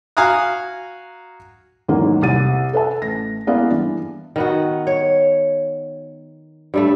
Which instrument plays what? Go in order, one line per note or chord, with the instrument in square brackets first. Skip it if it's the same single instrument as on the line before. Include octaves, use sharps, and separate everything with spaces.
[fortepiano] F#4 F5 G#5 A#5 D#6 F#6
[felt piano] E2 G#2 D#3 F#3 G#3 A#3
C2 G4 A6 D#7
A4 B4 E5 A5
A1 A#6
G#3 A#3 B3 E4 D5 F5
G2 E3
[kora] D#3 B3 F#4
C#5
G2 G3 A3